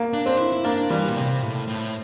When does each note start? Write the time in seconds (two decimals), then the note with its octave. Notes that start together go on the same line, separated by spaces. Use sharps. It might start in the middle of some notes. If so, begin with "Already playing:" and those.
Already playing: A#3
0.13 D4
0.26 C4 D4
0.38 E4
0.52 E4
0.64 A#3 D4
0.90 E3 G3
1.08 A#2
1.16 C3
1.42 A2
1.68 A2